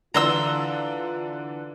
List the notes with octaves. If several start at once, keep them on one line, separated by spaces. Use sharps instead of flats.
D3 E3 D4 F4 A#5 C6 E6